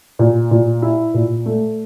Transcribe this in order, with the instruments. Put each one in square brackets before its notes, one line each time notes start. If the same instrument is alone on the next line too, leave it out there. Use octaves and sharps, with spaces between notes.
[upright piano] A#2
A#2
E4
A#2
A3